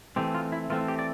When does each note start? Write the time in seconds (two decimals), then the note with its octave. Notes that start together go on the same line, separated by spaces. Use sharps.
0.16 E3 A3 C4 G4
0.35 F4
0.52 E4
0.70 E3 A3 C4 F4
0.88 G4
0.99 D5